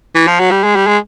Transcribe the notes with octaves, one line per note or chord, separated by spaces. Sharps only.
E3
F3
F#3
G3
G#3
G3
G#3